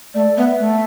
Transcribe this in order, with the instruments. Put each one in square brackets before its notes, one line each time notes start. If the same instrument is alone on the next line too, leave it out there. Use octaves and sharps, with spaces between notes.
[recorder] A3 [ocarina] D5
[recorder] B3 [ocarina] E5
[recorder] A3